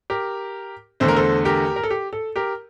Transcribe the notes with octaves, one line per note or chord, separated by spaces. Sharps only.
G4 A#4
E2 D3 A3 C5
A#4
A4 C5
G4 A#4
A#4
A4
G4
A4
G4 A#4